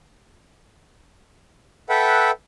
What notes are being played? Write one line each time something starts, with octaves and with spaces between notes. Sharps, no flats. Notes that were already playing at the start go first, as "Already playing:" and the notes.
A4 B4 E5 F#5 G5